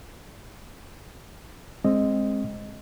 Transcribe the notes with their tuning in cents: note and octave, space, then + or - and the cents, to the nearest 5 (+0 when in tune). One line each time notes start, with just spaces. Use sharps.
G#3 +0 C4 +20 D#5 +0